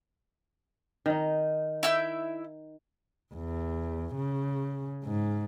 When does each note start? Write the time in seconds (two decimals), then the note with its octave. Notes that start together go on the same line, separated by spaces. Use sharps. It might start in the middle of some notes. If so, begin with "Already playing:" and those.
1.06 D#3 D#4
1.83 E4 E5 G6
3.34 E2
4.16 C#3
5.05 G#2